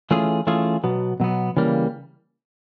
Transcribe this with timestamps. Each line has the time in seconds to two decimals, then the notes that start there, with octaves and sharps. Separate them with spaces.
0.11 E3 A3 C#4 F4 G#4
0.47 E3 A3 C#4 F4 G#4
0.84 B2 F#3 B3
1.20 B2 F#3 B3
1.57 C#3 E3 G3 A#3